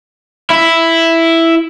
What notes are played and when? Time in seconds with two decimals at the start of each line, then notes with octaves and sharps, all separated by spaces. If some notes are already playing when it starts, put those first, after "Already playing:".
0.50 E4